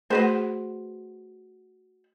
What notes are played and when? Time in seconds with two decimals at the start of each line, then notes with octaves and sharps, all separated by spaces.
0.10 A3 F#4 G#4 B4 C5